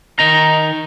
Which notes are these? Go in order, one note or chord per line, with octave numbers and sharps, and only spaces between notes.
D#3 D#4 A#5